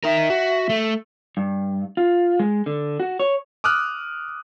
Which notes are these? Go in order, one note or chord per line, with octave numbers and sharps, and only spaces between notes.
D#4 A#4 E5
F#4
A3
G2
F4
G#3
D3
F#4
C#5
D6 D#6 F6 F#6